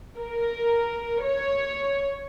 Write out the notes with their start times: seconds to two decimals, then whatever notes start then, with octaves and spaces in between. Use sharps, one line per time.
0.17 A#4
1.23 C#5